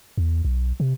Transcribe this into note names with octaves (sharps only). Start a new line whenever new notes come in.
E2
B1
C3